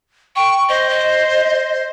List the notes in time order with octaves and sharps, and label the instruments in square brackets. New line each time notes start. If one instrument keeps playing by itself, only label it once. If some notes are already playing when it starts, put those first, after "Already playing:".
[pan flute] G5 [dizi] C#6
[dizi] C5 [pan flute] D#5
[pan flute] D#5